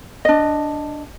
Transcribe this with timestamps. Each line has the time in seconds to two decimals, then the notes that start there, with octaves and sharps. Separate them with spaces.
0.25 D4 D#5